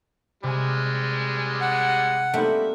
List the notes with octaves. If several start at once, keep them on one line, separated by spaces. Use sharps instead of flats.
C3 G3 G#3 G#5
F#5
G3 A3 A#3 C4 D#4 F#4 E5